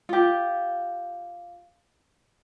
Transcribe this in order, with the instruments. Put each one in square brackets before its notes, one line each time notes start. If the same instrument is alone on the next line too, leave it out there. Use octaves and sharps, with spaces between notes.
[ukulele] F4 G4